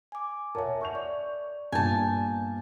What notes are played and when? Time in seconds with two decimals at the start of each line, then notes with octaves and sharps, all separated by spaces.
0.12 G#5 D6
0.55 A#4 C#5 E5 F#5 A5
0.81 C#6 G6 F7
0.95 D5
1.72 G2 A#2 B3 G#5 A5 G6